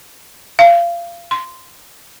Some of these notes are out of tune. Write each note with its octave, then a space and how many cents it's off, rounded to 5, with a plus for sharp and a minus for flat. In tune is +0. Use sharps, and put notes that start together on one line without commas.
F5 -25
C6 -15